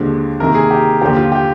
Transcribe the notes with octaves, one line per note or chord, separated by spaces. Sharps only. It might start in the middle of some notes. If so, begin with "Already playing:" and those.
Already playing: D#2 D3 F3 G#3 D4
C3 D#3 A#3 A#4
G#4
G4
D#2 D3 F3 G4
F4
G4